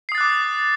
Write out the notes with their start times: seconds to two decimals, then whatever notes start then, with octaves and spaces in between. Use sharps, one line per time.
0.09 C7
0.12 D#6
0.15 A6
0.18 F#6
0.21 D6